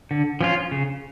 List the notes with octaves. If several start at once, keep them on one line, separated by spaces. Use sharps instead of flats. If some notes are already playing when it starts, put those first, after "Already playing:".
D3
F3 C#4 F4
C#3